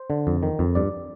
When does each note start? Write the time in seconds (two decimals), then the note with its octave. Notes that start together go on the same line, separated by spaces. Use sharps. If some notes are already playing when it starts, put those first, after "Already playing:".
Already playing: C5
0.10 D3
0.27 F2
0.43 D#3
0.59 F2
0.75 G2 D5